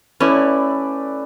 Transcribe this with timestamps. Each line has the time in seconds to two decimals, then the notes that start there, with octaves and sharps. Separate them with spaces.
0.20 A3 C#4 E4 B4 D5